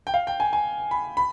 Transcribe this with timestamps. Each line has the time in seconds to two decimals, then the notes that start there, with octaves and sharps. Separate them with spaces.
0.07 G5
0.14 F5
0.27 G5
0.40 G#5
0.53 G#5
0.91 B5
1.17 B5